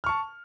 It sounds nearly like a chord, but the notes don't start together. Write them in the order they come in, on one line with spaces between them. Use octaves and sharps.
F6 C#6 A5